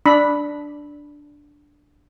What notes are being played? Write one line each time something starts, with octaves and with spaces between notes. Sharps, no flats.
D4 B5